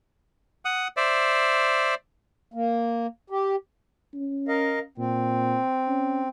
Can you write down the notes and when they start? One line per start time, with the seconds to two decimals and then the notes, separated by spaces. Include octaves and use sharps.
0.65 F#5 D#6
0.97 C5 D5 E5
2.54 A#3
3.30 G4
4.14 C#4
4.48 A#4 D#5 F5
4.98 A#2 C4
5.88 C#4